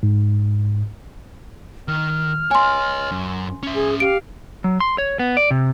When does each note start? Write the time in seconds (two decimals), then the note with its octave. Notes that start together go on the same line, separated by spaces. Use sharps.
0.03 G#2
1.88 D#3 F6
2.51 C#5 D#5 G#5 C6
3.11 F#2
3.63 C#4 E5
3.75 G#4 G#5
4.00 G4 F5 D7
4.64 F#3
4.80 C6
4.98 C#5
5.19 B3
5.37 D5
5.51 C3